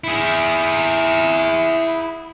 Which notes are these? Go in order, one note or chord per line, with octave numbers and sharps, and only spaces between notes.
E4 G#4